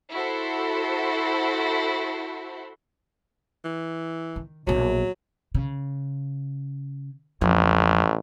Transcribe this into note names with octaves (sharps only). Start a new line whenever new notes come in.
E4 F#4 A4 C5
E3
D#3
A#1 B2 F#3
C#3
A1 F2 F3